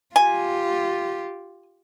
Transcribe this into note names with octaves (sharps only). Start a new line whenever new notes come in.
F4 G4 G#5